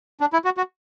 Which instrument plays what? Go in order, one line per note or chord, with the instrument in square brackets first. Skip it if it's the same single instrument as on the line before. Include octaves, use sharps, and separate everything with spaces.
[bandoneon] D4
E4
F#4
F#4